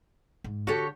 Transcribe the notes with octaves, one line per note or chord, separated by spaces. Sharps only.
G#2
D3 F#4 G4 A4 C#5